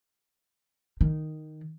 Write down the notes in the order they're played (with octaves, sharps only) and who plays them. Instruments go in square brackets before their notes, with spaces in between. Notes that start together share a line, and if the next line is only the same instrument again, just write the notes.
[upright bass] D#3